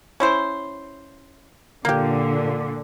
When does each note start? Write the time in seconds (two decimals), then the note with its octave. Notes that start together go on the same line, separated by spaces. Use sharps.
0.20 C#4 E4 C5
1.85 A#2 D3 A#3 G4